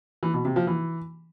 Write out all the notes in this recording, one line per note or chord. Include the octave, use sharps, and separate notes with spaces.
E3
B2
C3
F3
E3